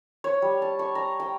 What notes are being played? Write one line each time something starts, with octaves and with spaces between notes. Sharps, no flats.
C#5
G3
A5
C#6
A#5
G5